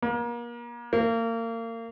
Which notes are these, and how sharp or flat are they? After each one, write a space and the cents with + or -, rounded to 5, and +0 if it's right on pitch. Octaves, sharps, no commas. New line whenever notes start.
A#3 +35
A#3 -30